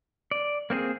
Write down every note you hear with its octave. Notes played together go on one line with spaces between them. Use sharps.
D5
A#3 C4 D4 G#4